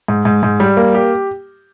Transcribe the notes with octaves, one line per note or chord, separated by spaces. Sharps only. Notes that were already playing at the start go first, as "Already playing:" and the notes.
G#2
G#2
G#2
G3
A#3
G4